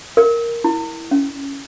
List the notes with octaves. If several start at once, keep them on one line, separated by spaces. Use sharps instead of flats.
A#4
E4
C#4